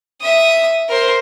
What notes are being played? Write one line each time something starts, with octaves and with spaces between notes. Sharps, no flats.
E5 D#6
A#4 C5